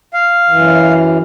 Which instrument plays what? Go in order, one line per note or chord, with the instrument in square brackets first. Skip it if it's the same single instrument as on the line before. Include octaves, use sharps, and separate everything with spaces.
[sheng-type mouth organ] F5
[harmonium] F#2 E3